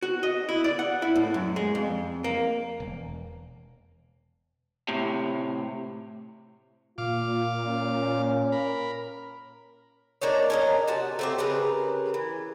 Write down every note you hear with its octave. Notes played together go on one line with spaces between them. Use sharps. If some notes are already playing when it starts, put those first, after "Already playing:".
F#4
D#5
E4
D5
F#5
E4
A2
F#2
G#3
F2
A#3
E1
A2 C3
A#2 F4 F5 D6
C#4
A#4 B5
A#3 D4 D#4 C#5
C#4 A#4 D#5
C3 F#4 A5
A3 C4 G4
C#3 G4 A#4 B4
E3